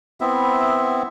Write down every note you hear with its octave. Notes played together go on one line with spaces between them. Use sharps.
B3 C4 E4 E5